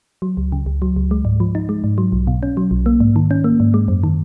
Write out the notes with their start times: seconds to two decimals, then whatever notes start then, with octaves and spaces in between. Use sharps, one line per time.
0.22 F#3
0.37 C#2
0.52 C#3
0.66 C#2
0.82 F#3
0.96 C#2
1.11 G#3
1.25 G#2
1.40 F3
1.55 D#4
1.69 G#3
1.84 G#2
1.98 F#3
2.12 B1
2.27 B2
2.43 C#4
2.57 F#3
2.71 B1
2.86 A#3
3.00 G#2
3.16 D#3
3.31 C#4
3.44 A#3
3.60 G#2
3.74 G#3
3.88 F#2
4.03 D#3